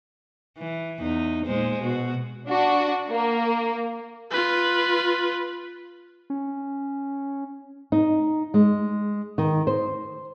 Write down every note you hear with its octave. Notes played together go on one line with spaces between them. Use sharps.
E3
E2 D#4
A#2 G#3 C5
B2 F#4
D4 F#4
A#3
F4 B4
C#4
D#4
G#3
D#3
C5